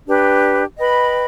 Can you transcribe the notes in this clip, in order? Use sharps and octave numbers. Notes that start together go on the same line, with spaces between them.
D4 G4 B4
B4 D#5 G5 B5